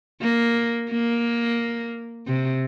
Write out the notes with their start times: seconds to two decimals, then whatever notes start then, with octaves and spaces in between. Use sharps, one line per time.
0.21 A#3
0.90 A#3
2.27 C3